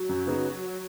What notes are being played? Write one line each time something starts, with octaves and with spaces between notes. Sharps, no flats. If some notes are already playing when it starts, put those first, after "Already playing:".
Already playing: F#3
F#2
C#3 B3 D#4